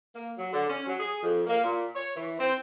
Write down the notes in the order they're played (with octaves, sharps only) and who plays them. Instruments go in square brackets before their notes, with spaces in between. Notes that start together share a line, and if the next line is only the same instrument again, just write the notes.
[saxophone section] A#3
F#3
D3
C#4
F#3
G#4
F2
A#3
A#2
C#5
E3
C4